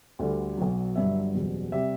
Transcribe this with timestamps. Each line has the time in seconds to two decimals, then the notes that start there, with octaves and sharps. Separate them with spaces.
0.19 D2 D3 G3
0.57 B1 B2 F#3
0.96 G1 G2 F#3 E5
1.34 F#1 E2 B2 G3
1.72 C3 G3 E5